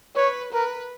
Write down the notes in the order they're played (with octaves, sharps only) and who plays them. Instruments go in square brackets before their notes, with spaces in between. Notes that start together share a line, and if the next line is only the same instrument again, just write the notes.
[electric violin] B4 [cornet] C#5
[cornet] A#4 [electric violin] B4